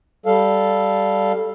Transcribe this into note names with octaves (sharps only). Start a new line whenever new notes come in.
G3 A4 F5